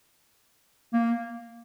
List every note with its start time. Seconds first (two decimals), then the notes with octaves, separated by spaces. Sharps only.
0.93 A#3